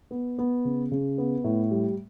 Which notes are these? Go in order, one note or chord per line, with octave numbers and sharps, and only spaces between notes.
B3
B3
C#3
C#3
B3
A2
G3